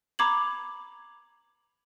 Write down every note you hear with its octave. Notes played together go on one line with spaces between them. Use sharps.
A#5 B5 D6 G#6 F#7